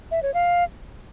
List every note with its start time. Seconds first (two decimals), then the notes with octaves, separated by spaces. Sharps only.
0.11 E5
0.23 C#5
0.34 F5